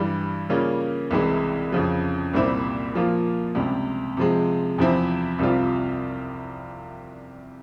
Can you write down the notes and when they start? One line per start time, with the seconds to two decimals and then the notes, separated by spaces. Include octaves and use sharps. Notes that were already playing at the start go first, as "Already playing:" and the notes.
Already playing: G2 E3 G3
0.50 C#3 G3 A#3 C#4 F4
1.11 C2 C3 E3 G#3 E4
1.72 F2 C#3 F3
2.33 C2 A#2 G3 C4 E4
2.94 A#2 F3 A#3 F4
3.55 C#2 C3 G3
4.17 C3 F3 G#3
4.78 E2 C3 F3 C4 E4
5.39 C2 C3 G3 C4 F4